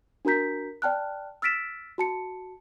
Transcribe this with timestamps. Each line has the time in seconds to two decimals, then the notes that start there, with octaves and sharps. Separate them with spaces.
0.25 D4 F#4 A#4 A#5 G6 B6
0.82 D5 G5 A5 F6 F#6
1.42 E6 F6 A6 B6 D7 E7
1.98 F#4 A5 C#7